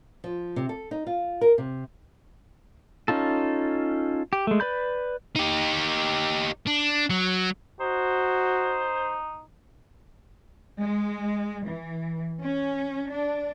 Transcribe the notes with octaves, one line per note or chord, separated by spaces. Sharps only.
F3
C3
A4
D#4
F4
A#4
C3
C#4 D#4 F4 A4
G4
G#3 A3
B4 D5 B5 G6
D#4 G4
D4
F#3
D#4 F#4 C5
G#3
E3
C#4
D4